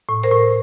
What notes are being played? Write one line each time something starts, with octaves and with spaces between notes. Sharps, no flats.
A2
A#4 C5
A2